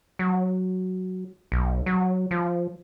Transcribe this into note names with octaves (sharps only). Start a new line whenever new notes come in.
F#3
B1
F#3
F3